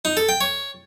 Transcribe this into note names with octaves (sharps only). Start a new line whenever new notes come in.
D#4
A4
G5
C#5